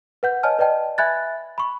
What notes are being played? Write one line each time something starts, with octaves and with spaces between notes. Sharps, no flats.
B4 F#5 G6
C#5 D#5 G#5 A5 F6
B4 D5 D#5 G5 A5
E5 G#5 B5 F#6 G#6 A6
B5 C#6